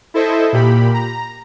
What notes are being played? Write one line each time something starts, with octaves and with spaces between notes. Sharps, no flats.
E4 A4 C5 D#5 E5
A#2 G4 B5
A#5